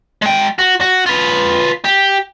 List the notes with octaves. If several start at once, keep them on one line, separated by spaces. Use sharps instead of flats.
G#3 G5
F#4
F#4
F4 B4
G4